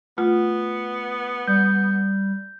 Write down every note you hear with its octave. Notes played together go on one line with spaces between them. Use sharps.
A3 B3 F4 F#5
G3 G6